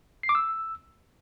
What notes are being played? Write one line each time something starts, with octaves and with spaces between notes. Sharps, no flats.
C7
D6
E6